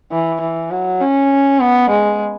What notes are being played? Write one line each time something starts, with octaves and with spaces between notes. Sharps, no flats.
E3
E3
F#3
C#4
B3
G#3